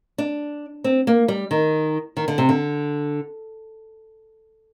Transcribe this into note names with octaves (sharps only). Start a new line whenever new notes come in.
D4
C4
A#3
G3
D#3
D#3
D3
C3
D3